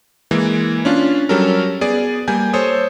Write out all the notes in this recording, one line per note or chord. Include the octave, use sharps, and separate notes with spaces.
E3 G#3 A#3
C#4 D4 F4
F#3 G3 C#4 A4 A#4
B3 G#4 D5
G3 A#3 G#5 G6
A4 C5 C#5 D#6